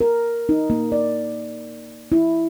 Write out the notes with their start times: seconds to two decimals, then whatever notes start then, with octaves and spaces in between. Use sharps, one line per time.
0.01 A#4
0.49 D#4
0.70 A#3
0.92 D5
2.12 E4